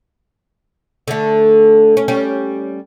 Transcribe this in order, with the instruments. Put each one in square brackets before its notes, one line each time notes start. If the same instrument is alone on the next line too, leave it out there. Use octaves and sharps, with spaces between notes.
[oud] D3 A3
C#4
G3 C#4 G4